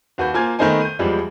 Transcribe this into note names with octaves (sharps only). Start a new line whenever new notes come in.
D#2 F#4 B4 G6
A#3 F4 C5 G#5 G#6
D#3 A3 B3 D#4 C5 G#5
G6 D#7
E2 F3 G3 G#3